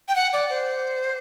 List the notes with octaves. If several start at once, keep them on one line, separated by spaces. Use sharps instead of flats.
G5
F#5
D5
C5